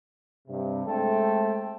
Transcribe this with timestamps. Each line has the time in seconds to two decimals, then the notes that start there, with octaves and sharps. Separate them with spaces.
0.48 G2 C3
0.86 G#3 A3 C4 A4 E5 G5